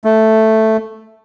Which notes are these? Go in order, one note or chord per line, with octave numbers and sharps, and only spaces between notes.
A3